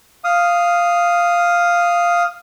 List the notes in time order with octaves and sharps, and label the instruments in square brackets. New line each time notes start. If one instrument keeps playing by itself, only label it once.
[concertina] F5 D#6